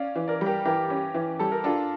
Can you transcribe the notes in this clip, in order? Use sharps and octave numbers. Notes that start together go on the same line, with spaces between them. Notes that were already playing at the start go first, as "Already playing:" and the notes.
Already playing: C#4 D5 F5
E3
A#4 D5
G3
G4 A#4
E3 G4 A#4
C#4
E3
G3 A4
A#4
D4 F4 A4